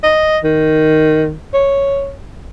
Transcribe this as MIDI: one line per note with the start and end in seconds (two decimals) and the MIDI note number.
0.03 0.38 75
0.44 1.34 51
1.53 2.12 73